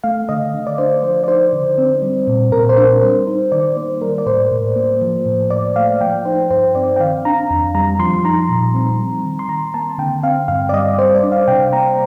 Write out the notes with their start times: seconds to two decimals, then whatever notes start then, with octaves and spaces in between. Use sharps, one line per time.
0.04 A3 F5
0.29 D3 D#5
0.54 D3
0.67 D5
0.78 D4 C5
1.03 F3 C5
1.24 D5
1.28 D#4 C5
1.53 D3
1.78 C4
2.02 G3
2.27 A#2
2.52 A#2 A#4
2.69 C5
2.77 D4 A#4
3.02 G3 C5
3.27 D#4
3.52 D#3 D5
3.77 A#3 C5
4.01 G3 A#4
4.18 D5
4.26 A2 C5
4.51 A2
4.76 A#3
5.02 F3
5.26 A2
5.50 A2 D5
5.76 A3 F5
6.01 F3 G5
6.25 D#4 C5
6.50 G2 C5
6.75 C4 D5
6.96 G5
7.00 D#3 F5
7.25 D4 A#5
7.50 F2
7.75 G3 A#5
7.99 F3 C6
8.25 D#4 A#5
8.49 A#2
8.75 C4
8.99 G3
9.24 D#3
9.39 C6
9.48 D#3 A#5
9.74 A#3 A5
9.98 D3 G5
10.23 C4 F5
10.48 G2 F5
10.69 D5
10.73 G3 D#5
10.99 G3 C5
11.15 D5
11.23 D4
11.32 F5
11.48 C3 G5
11.73 A#3 A#5